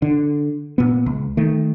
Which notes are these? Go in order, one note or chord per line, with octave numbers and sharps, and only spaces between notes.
D3
A#2 B3
C#2
D#3 A3